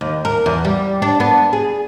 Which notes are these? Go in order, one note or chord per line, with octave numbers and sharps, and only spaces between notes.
D#2
A#4
E2
G3
D4
B3
G#4